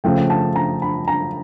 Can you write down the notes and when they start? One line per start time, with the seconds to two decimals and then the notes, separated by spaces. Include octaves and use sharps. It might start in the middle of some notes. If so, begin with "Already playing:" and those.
0.04 C#3 F3 A3 G5
0.30 A5
0.56 A#5
0.82 B5
1.08 A#5